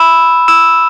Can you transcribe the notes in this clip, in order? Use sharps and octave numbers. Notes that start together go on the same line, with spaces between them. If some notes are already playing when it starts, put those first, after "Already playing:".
Already playing: B5 E6 E7
E6 E7